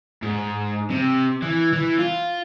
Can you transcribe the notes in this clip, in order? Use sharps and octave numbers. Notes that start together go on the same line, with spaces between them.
G#2
C3
E3
E3
F4